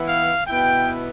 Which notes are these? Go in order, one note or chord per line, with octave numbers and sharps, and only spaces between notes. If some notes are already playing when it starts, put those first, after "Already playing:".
Already playing: E3 B3 E4
F5
B2 B3 E4 G5